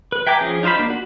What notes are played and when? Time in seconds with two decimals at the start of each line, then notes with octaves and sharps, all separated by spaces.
0.12 B4
0.27 E5 G5 G#5 A#5 D6
0.40 F3 C#4 G#4
0.63 D#4 F4 C5 F5 B5
0.77 A#3 D4
0.90 F#4